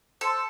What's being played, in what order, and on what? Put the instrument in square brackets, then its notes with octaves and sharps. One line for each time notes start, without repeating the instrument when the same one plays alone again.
[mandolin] A4 [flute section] C5 A5 C6